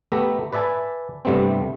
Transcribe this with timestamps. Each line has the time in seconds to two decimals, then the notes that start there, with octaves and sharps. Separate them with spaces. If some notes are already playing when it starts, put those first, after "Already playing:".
0.12 A3 B3 G4 E5 A#5
0.52 B4 D5 E5 G#5 A5
1.25 G2 C3 G3 A3 B3 C4